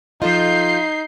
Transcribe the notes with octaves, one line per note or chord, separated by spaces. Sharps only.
F3 D#4 F4 A4 D#5 G6 C7